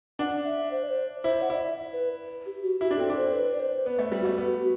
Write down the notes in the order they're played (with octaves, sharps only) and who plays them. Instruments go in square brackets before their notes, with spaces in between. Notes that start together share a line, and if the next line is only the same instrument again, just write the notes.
[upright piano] D4 [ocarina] F#5
[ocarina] E5
C5
D5
C5
[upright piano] E4 [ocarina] C5
[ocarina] F#5
[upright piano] E4 [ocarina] D5
[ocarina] E5
B4
G4
F#4
[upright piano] E4 [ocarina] F#4
[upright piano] D4
[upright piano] C4 [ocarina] A4
[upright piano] D4
[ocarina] C5
B4
D5
C5
[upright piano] B3 [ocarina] B4
[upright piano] A3
G3
[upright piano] A3 [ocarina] F#4
[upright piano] B3